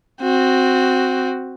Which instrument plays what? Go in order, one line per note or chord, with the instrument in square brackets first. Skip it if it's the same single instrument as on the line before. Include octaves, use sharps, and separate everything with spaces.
[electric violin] C4 F#4